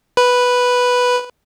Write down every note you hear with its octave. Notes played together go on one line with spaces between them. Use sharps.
B4